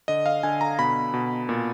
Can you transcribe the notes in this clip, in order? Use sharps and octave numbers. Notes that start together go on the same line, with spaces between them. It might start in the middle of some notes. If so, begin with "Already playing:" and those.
D3 D#5
F5
D3 G#5
A#5
B2 B5
B2
A#2